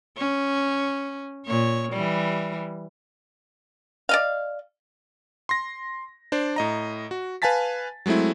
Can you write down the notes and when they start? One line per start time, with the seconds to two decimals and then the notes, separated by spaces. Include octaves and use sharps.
0.17 C#4
1.46 A#2 C#5
1.93 E3 G3
4.09 D5 D#5 F5
5.49 C6 A#6
6.32 D4 C5 D5
6.56 A2 D#5 A#5
7.11 F#4
7.42 B4 F5 G#5 A5 A6 B6
8.06 F#3 G#3 A3 C4 E4